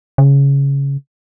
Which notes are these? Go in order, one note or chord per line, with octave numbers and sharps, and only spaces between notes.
C#3